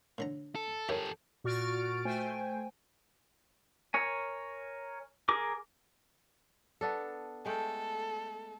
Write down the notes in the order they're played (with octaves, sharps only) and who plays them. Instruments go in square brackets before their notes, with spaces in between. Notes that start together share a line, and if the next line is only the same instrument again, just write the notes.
[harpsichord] A2 D3 A#5
[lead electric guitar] A4
[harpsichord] E4 A#4 C#5 [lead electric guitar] G4 A4
[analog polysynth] A#2 F#4 C#6 F6 A6 D7
A3 C5 G5 G#5
[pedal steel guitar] A#4 C#5 G#5
G#4 A#4 D6
[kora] B3 D4 A4
[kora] G#3 A3 G5 [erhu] A4